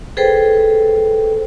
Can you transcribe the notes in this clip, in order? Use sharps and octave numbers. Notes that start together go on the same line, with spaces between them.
G#4 A4 B4 C5 G5